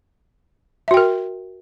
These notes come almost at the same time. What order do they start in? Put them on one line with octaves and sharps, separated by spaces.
E5 F#4 G5 A#4